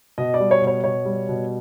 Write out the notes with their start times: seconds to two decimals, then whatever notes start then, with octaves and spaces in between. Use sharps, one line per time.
0.18 B2 D#5
0.34 D5
0.40 G3
0.51 C#5
0.62 B2
0.67 C#5
0.84 B2 C#5
1.05 G3
1.29 B2